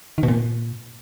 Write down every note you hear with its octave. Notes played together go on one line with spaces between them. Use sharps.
D#3
B2
A#2